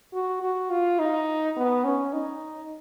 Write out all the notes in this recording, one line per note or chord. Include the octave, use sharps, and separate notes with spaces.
F#4
F#4
F4
D#4
B3
C#4
D#4